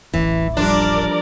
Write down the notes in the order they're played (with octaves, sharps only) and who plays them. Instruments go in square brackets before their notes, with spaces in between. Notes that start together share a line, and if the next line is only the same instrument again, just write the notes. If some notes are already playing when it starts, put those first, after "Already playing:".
[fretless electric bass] D1 A1 [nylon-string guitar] E3
[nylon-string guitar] F3 G3 [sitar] D4 [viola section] A#4 D5